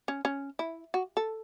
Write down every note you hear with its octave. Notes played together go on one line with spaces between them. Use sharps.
C#4
C#4
E4
F#4
A4